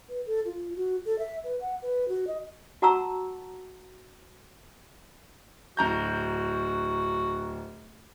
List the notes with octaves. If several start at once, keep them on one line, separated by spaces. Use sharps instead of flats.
B4
A4
F4
F#4
A4
E5
B4
F#5
B4
F#4
D#5
F#4 F#5 A5 A#5 C#6 E6
D1 F#4 A#5 G6